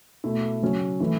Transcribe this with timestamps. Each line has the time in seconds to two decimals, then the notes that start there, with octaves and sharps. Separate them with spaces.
0.24 B2 A3 E4
0.62 C#3 F#3 C#4
1.00 E3 A3 E4